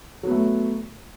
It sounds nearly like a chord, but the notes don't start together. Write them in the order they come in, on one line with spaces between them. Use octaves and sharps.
F#3 B3 A3